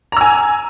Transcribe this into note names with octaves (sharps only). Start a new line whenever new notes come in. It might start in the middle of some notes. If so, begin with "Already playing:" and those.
G#5 A#5 E6